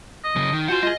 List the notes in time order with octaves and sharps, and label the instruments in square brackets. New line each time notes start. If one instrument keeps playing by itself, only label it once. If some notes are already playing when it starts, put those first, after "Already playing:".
[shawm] D#5
[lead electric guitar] C#3 F#3
D#3
[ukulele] F4 F#4 G#5 [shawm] C5 [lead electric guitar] F#5 C6
[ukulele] F4 G#4 [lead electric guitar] D#5